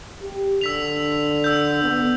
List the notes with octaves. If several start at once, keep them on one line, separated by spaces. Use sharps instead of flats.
G4
D3 E6 B6 F7
E6 G6
B3